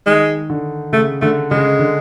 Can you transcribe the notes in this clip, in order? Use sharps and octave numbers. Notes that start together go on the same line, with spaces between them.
D#3 G#3
D3
C#3 A3
D3 A3
C#3 G#3
D3